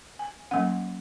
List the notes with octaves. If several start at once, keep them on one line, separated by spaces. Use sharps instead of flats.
G#5
F#3 A#3 C#4 F#5